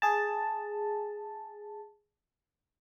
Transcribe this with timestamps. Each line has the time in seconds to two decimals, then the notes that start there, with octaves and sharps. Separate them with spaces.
0.02 G#4 A5